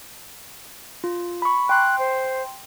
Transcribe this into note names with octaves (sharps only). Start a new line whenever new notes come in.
F4
B5 C#6
G5 C6 F#6
C5